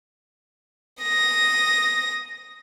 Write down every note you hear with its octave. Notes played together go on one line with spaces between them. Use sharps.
D#6 A#6